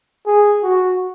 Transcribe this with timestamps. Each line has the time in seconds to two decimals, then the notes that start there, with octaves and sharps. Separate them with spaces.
0.26 G#4
0.63 F#4